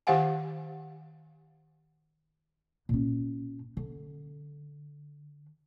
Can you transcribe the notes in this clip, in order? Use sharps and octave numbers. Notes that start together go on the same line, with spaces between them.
D#3 G4 C5 F5 F#5 G#5
A#2 C#4
D3